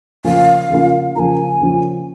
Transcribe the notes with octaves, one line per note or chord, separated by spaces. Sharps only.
C#3 F3 A#3 C#4 F4 F5
C#3 F3 A#3 C#4 F4
C#3 F3 A#3 C#4 F4 G#5 A#5
C#3 F3 A#3 C#4 F4